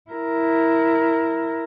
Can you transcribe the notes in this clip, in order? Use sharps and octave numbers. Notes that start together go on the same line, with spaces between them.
E4 A#4